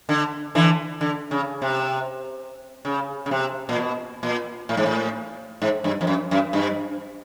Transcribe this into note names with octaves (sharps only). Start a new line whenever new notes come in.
D3
D3 E3
D3
C#3
C3
C#3
C#3
C3
A#2
B2
A#2
A2
G#2
A2
G#2
G2
F2
F#2
F#2
G2